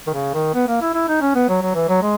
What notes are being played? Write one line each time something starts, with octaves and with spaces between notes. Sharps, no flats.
D#3
C#3
D#3
B3
A#3
E4
E4
D#4
C#4
B3
F#3
F#3
E3
F#3
G#3